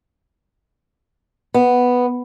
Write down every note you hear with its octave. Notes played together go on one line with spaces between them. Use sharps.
B3